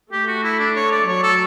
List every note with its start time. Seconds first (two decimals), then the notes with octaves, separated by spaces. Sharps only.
0.12 A3 G4
0.28 F#4
0.43 E4
0.59 D4
0.76 C#5
0.91 D5
1.08 F#3 C#5
1.23 A4